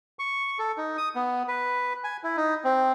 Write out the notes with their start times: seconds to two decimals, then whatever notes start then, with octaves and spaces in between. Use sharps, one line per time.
0.19 C#6
0.59 A4
0.77 D#4
0.97 D#6
1.15 B3
1.48 B4
2.04 G#5
2.23 E4
2.37 D#4
2.64 C4